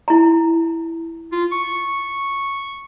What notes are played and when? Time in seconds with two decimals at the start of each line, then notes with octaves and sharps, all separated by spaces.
0.08 E4 A#5
1.32 F4
1.52 C#6